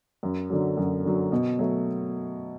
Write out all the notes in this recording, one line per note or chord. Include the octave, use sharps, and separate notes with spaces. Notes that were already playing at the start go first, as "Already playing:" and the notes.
F#2
D3 F#3
F#2
D3 F#3
B2
F#3 A3